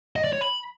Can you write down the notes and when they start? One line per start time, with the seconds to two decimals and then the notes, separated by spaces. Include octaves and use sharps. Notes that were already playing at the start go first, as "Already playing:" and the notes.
0.16 D#5
0.24 D5
0.33 C#5
0.41 B5